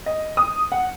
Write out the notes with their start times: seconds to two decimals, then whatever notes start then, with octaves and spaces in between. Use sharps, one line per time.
0.06 D#5
0.37 D#6
0.72 F#5